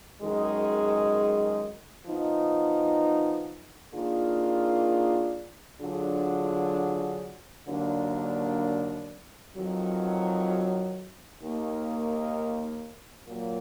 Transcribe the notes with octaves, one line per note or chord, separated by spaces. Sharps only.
F#2 D#3 G#3 D#4 G#4
F3 B3 D#4
D#3 A#3 D4 F4 G#4
D3 F#3 D4 F4 G#4
D#2 D3 F#3 A#3 D4
F2 D#3 F#3
D#2 D#3 A#3
A#2 F#3 A#3